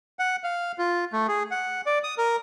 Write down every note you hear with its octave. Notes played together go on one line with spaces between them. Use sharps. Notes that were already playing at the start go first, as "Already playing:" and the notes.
F#5
F5
F4
A3
G#4
F#5
D5
D#6
A#4